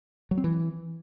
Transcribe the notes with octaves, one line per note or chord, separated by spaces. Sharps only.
F#3
C4
E3